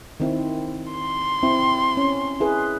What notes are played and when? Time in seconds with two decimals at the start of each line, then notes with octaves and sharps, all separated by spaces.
0.20 D#3 C4 E4
0.92 C6
1.43 C4 E4
1.97 C#4
2.40 E4 G#4 B4